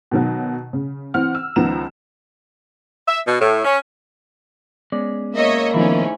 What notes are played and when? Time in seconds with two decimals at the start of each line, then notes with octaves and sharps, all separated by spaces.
0.11 B2 D#3 F#3
0.73 C#3
1.14 E3 C4 F#5 F6
1.35 E6
1.56 C#2 D#3 F3 B3 A#5 E7
3.08 E5
3.27 B2
3.40 A2
3.65 C#4
4.92 G#3 B3 C#4 D5
5.35 A#3 C#5 D#5 E5
5.74 G#2 D#3 F3 A3 B3 C#4 E4